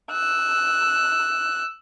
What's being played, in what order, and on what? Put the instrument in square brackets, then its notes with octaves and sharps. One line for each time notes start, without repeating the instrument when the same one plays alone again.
[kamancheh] E6 F#6